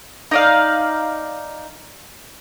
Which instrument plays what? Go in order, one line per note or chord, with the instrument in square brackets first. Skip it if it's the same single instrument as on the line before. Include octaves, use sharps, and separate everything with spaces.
[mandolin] D#4 D5 F5